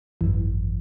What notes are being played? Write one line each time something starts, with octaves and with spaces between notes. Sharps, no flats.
G#1 F#2 E3